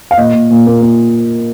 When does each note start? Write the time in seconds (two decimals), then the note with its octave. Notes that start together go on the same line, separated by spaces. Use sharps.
0.11 F5
0.17 A#2 D#5
0.34 A#2
0.50 A#2
0.67 A#3
0.81 A#3